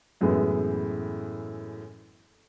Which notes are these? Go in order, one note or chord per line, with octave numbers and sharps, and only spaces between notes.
F#2 A2 E3 G#3 B3